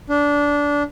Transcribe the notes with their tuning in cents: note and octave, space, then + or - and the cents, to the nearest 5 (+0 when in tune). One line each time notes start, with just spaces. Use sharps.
D4 -20